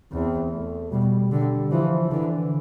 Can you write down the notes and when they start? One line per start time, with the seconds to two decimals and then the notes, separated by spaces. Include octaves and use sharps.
0.12 E2 C4
0.52 A3
0.92 B2 G3
1.31 D3 G3
1.71 E3 F3
2.11 D3 E3